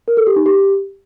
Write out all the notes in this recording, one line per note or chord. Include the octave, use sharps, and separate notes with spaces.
A#4
A4
G4
D#4
G4